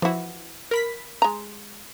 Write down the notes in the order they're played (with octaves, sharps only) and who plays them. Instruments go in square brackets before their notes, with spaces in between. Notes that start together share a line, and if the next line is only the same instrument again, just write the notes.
[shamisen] E3 F#4 [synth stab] F3 E4
[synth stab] A#4 B5 B6
[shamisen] G#3 A#5